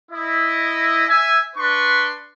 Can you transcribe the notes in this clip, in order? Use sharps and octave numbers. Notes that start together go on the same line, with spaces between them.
E4 D#5
E5 G#5
D4 B4 C6 C#6